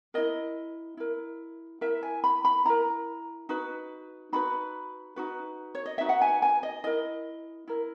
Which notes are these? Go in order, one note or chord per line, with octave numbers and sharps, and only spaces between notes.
E4 A#4 D#5
E4 A#4
E4 A#4 E5
G#5
B5
B5
E4 A#4 A#5
D#4 F#4 B4
D#4 F#4 B4 B5
D#4 F#4 B4
C#5
D#5
D#4 F#4 B4 E5
F#5
G#5
G#5
D#5
E4 A#4 D#5
E4 A#4